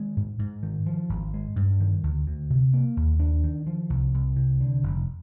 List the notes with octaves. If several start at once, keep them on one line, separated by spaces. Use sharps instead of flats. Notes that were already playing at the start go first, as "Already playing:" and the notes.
Already playing: D#3 G#3
G#2
G#2
D#3
F3
G#1
G#3
G2
D#3
D2
D2
C3
A#3
D#2
D4
D#3
F3
C2
C2
C3
D3
F1